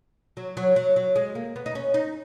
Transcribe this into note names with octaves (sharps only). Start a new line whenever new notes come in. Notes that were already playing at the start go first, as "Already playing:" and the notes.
F#3
F#3
F#3
F#3
G#3
A#3
B3
D#4
C#4
D#4